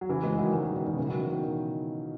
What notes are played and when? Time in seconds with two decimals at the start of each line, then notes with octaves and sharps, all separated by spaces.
0.01 F#3
0.09 C#3 E3
0.24 E3 G#3
0.38 D#3 F#3
0.54 E3 G#3
0.65 D#3 F#3
0.76 B2 D#3
0.87 B2 D#3
0.97 C#3 E3
1.08 D#3 F#3
1.19 C#3 E3
1.31 B2 D#3